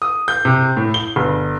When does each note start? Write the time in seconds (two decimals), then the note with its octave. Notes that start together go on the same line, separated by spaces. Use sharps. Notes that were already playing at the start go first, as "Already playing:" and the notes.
0.02 D#6
0.28 G6
0.45 C3
0.77 A2
0.94 G7
1.16 G1